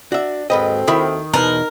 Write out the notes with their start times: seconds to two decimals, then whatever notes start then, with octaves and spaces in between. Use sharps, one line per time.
0.12 D4 F#4 E5
0.50 D#2 G#2 C4 F#4 A4 B4 D#5
0.88 D#3 E4 E5 B5
1.34 E2 B2 D#4 A#4 B4 A5